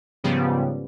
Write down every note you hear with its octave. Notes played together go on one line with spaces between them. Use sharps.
G#2 C#3 F3 G3 B3